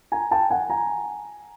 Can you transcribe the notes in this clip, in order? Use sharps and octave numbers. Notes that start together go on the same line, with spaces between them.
G#5 A#5
G5 A5
F#5 G#5
G#5 A#5